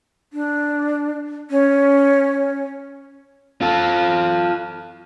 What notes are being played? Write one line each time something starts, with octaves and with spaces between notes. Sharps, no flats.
D4
C#4
F4 A4